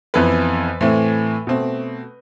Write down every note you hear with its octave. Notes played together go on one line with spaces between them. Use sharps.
F2 E3 B3 B4
A2 E3 A3 C4
B2 A3 C4